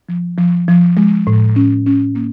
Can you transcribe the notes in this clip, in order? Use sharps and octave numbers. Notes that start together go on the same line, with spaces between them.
F3
F3
F3
G#3
A2
C#4
C#4
A#3